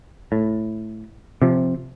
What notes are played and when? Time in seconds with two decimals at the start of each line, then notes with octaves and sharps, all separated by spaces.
0.32 A2
1.42 C3 F3